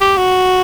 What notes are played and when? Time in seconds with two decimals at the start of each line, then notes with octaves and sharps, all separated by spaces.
0.01 G4
0.17 F#4